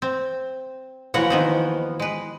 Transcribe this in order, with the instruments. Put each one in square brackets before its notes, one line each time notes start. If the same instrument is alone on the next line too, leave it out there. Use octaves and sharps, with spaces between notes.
[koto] C4
[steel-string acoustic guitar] D#2 E3 F3 [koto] F#4 C#5 F#5
[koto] D#3 B3 C4
G#3 B4